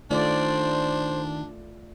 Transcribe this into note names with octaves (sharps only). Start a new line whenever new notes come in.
D#3 A3 D4 F4 C5 D5